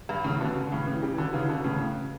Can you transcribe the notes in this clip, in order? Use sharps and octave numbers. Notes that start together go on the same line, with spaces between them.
G2
A2 C#3
B2 D3
A2 C#3
C#3 E3
E3 G3
D3 F#3
C#3 E3
B2 D3
A2 C#3